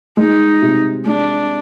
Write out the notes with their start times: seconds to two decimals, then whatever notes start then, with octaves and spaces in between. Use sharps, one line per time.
0.17 G#3 D#4
0.62 C3
1.06 G#3 D4